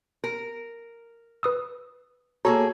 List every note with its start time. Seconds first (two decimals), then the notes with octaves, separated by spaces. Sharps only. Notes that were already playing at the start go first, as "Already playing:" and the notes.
0.24 A#4
1.43 B4 D#6 E6
2.45 A#3 F#4 G#4 A4 C#5 A#5